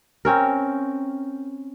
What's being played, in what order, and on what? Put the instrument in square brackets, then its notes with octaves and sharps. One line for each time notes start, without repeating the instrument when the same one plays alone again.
[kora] C4 C#4 A#4